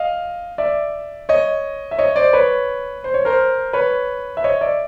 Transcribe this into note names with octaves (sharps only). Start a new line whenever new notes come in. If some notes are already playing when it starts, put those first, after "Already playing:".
Already playing: D#5 F5
D5 E5
C#5 D#5
E5
C#5 D#5
C5 D5
B4 C#5
C5
C#5
A#4 C5
B4 C#5
E5
C#5 D#5
D5 E5